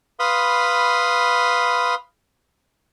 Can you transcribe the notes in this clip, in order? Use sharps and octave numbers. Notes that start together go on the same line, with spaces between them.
B4 F5 B5 C6 D#6